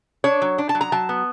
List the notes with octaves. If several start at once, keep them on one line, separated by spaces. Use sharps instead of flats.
D4 C#5
F#3
D4
A5
F#3
A#5
F#3 A5
B3